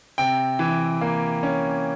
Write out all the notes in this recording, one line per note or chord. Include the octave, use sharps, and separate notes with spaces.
C3 G5
E3
A#3
C#4